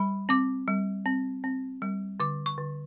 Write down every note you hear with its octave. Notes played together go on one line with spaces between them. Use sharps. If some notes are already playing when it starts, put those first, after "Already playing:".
Already playing: G3 B5
C4 D6
G3
C4
C4
G3
D3 D6
C#6
D3